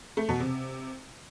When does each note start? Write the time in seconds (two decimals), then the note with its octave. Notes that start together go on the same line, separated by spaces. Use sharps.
0.17 A3
0.29 B2
0.40 C3